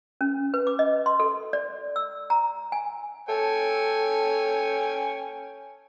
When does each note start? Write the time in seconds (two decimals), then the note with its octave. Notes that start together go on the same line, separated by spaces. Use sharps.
0.21 C#4
0.54 B4
0.67 D6
0.79 D#5
1.06 C6
1.20 A4
1.53 D5
1.96 E6
2.30 A#5
2.72 G#5
3.29 A4 C#5 G5 G#5